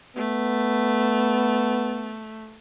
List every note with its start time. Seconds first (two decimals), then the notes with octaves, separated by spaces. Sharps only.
0.17 A3 B3